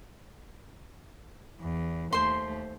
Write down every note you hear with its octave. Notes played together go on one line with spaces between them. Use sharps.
E2
D#2 A3 C5 C6